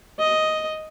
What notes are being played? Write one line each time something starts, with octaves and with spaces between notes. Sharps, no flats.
D#5